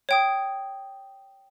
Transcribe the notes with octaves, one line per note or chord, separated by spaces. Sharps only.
C#5 G5 D#6